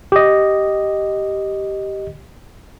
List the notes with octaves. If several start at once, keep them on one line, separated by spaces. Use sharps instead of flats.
G4 D#5